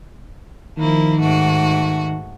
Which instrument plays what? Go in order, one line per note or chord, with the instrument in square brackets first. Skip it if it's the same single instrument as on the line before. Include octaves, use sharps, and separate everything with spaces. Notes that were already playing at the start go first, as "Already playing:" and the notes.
[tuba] D#3 [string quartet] F3 A#3 E4
[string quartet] G#2 A3 F#4